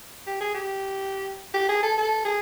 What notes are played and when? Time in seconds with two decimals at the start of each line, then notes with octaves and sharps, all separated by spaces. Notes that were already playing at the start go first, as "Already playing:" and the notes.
0.27 G4
0.41 G#4
0.54 G4
1.54 G4
1.69 G#4
1.83 A4
1.98 A4
2.25 G#4